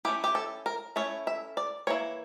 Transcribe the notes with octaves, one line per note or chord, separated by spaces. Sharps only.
A3 C#4 E4 G4
G4
A4
A#4
A3 C#4 E4 C#5
E5
D5
E3 A#3 E4 C#5